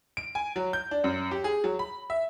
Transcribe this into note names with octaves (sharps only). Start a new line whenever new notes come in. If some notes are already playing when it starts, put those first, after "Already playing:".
D7
G#5
F#3
G6
D4
F#2
G4
G#4
F#3
B5
E5